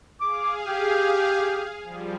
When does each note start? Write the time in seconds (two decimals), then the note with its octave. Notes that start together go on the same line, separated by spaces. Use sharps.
0.21 G#4 F5 D6
0.66 G4
1.83 F3 G3